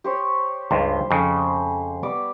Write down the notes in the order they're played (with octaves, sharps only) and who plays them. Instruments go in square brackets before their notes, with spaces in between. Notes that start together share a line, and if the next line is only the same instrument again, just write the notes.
[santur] G4 C5 C#5
[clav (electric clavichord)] C#2 G2 [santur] C5
[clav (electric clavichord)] F2 C#3
[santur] G3 B3 D6